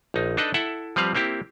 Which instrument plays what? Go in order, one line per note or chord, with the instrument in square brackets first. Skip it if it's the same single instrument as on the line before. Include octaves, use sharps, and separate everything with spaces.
[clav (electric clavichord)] A#1 D#4
D4 D#4 A4 B4 D#5
E4 A4 E5 F#5
F3 G3 C4 B4 F5
A#3 C4 E4 G4